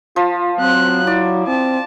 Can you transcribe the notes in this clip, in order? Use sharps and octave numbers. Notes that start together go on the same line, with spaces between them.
F3 F4
F#3 C4 F#6
E4 D5
C4 A5